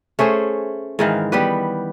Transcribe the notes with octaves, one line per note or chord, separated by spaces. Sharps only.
A3 C#4 G#4 C5
G#2 D#3 E3 F5
G3 B3 G4 B4